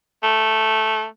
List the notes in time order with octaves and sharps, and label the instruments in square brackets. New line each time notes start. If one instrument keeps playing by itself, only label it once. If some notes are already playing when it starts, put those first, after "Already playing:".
[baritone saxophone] A3